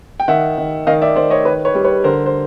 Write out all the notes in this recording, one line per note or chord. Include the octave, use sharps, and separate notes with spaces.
G5
D#3 E5 F#5
D#3
D#3 D#5 F5
D5 E5
D#3 C5 D5
C#5 D#5
D#3 B4 C#5
B4 C#5
G3
B4 C#5
D3 A#4 C5
C5